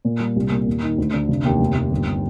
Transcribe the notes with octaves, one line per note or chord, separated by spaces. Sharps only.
A#2
G3
C2
A#2
D#2
D#3
D2
D3
F1
D#2
F1
D#2
G1